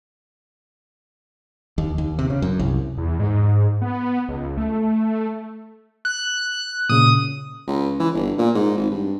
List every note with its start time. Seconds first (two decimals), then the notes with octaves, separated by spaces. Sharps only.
1.78 D#2
1.98 D#2
2.19 C3
2.30 C#3
2.42 F#2
2.59 C2
2.98 E2
3.19 G#2
3.82 B3
4.29 C#2
4.58 A3
6.05 F#6
6.89 A#2 C#3 D#6
7.67 C#2
8.00 E3
8.14 G1
8.38 A#2
8.55 G#2
8.77 G#1
8.91 G2